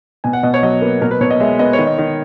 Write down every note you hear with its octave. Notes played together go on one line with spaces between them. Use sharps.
B2 G#5
F#5
B2 D#5
C#5
F#3 D#5
A#3 B4
B2 A#4
B4
B2 C#5
D#5
G#3 E5
B3 D#5
D#3 C#5
D#5
D#3